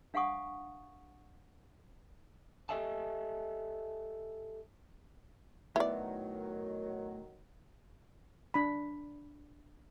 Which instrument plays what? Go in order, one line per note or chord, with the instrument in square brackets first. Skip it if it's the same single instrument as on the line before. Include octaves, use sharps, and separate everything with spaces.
[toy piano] D4 F5 F#5 G#5 C#6 D#6
[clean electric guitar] G4 A4 D#5 E5 G#5 A5
[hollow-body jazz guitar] A2 B3 [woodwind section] D#3 F#3 [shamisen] E4 D5
[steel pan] D4 B5